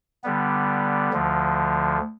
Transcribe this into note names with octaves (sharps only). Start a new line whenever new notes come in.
D3 G3 B3
D2 D3 F3